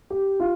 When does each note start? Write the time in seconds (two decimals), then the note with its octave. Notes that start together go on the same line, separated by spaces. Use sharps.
0.10 G4
0.40 F4